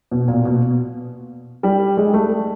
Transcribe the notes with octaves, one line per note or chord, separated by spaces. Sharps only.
B2
A#2
B2
G3
G#3
A3